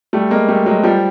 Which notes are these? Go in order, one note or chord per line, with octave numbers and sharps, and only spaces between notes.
G3 A3
G#3 A#3
G3 A3
F#3 G#3
F3 G3